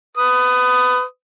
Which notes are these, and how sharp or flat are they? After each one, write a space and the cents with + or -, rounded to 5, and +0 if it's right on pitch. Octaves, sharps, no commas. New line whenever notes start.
B4 +25 D#6 +0